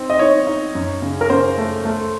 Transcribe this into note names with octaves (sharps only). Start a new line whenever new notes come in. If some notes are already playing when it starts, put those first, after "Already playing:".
Already playing: C4 D#4
D#5
D#4 C#5
D#4
F#2
C#3
A#4
C#3 C5
A3
A3